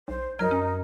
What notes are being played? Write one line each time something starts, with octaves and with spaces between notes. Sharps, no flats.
B1 C5
F#2 F#3 D#4 A#4 F6
C#4